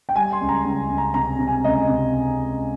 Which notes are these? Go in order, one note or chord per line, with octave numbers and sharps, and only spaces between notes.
G5
G3 G#5
C6
C#2
A#5
C#2 A#5
C#2
A#5
C3 A#5
C3
G#5
C#2 D#5
C3